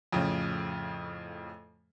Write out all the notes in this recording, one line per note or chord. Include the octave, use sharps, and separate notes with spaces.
F2 A2 C#3 F3